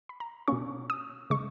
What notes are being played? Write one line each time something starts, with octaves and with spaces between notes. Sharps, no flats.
B5
A#5
B2 A#3 C#4 C#6
D#6
C#3 G#3 C#6